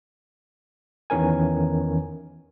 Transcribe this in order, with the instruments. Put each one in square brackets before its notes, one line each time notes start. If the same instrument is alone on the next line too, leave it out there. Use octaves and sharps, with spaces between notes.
[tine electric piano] E2 D#3 E3 C#4 A#4 G#5